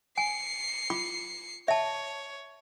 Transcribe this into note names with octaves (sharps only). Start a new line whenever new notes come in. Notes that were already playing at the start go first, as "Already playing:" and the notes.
G#5 C7 C#7
F4 B5 D6
C#5 E5 A5